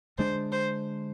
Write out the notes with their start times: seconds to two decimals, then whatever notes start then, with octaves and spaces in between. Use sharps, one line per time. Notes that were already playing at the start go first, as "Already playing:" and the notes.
0.18 D3 G#3 D4 C5
0.52 C5